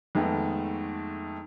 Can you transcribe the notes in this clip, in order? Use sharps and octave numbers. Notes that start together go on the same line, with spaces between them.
F2 D#3 G#3 A3 B3